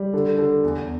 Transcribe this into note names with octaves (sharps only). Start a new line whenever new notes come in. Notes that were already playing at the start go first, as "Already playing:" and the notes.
Already playing: G3
D3
D3
E2